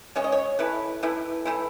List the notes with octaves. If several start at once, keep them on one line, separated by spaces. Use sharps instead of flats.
C#3 G#3 C#4 C#5
D#5
C#5
E3 A3 E4 B4
E3 A3 E4
E3 A3 E4